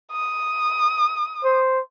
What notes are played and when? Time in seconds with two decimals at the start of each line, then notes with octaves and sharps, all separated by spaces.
0.12 D#6
1.44 C5